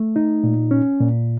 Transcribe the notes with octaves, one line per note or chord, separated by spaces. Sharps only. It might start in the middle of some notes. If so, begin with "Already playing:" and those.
Already playing: A3
D#4
A#2
C#4
A#2